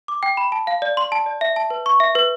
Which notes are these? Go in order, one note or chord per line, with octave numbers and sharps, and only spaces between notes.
D6
G5
B5
A5
F5
D5
C6
A5
D5
E5
A5
B4
C#6
E5
B4